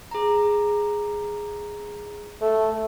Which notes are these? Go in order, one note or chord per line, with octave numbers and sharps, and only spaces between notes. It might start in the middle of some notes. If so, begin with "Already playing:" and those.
G#4 A#5
A3